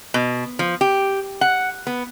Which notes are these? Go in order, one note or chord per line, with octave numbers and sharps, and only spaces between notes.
B2
F3
G4
F#5
B3